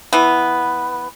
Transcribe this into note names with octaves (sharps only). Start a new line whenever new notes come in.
E3 B3